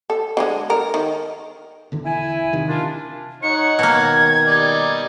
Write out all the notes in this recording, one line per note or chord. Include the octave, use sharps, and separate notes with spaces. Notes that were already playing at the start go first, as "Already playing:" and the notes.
A4
D3 F#3 G#3
A4 A#4
D#3
E1 D3 E3
E4 G#5
C3 D#3
A#3 D4 F4
D#4 C#5 F#5 C#7
B2 D#3 A#3 G#6
G3 D#4 D5